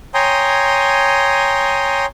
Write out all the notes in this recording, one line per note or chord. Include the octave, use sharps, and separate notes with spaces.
C#5 G5 G#5 A#5 C6 D#6